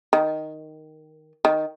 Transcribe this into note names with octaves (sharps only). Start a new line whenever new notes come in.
D#3
D#3